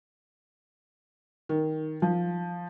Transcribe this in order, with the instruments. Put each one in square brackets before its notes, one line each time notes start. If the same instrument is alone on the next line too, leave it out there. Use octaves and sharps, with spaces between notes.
[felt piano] D#3
F3